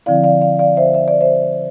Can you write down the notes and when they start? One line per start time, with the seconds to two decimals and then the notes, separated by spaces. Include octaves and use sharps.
0.06 D3 F3 C4 E4 D5 F5
0.24 D5 F5
0.41 D5 F5
0.59 D5 F5
0.77 C5 E5
0.94 E5
1.08 D5
1.21 C5 E5